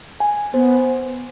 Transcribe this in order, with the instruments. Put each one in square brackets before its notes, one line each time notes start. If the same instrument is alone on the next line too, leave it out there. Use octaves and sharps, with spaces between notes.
[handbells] G#5
[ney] B3 [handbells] C5